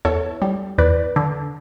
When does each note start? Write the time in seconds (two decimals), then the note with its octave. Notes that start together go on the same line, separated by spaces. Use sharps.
0.05 E2 A4 C#5
0.42 G3
0.78 E2 B4 D5
1.16 D3